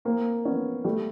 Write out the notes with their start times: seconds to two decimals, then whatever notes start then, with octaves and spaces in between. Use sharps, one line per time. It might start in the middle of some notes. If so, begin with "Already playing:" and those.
0.05 A#3 C4
0.45 B3 C#4
0.84 G3 A3